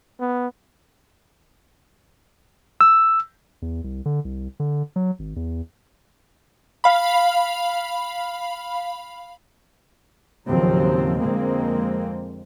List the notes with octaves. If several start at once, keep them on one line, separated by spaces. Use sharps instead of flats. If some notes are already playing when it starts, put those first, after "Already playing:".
B3
E6
E2
C2
D3
C2
D3
F#3
G#1
E2
F5 B5
D#2 A2 C#3 F3 F#3 C4
F2 D3 G#3 A#3 C4